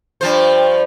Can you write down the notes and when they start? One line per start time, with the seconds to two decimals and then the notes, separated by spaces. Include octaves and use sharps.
0.21 G2 F3 C5